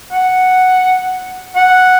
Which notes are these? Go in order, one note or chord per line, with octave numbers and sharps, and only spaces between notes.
F#5
F#5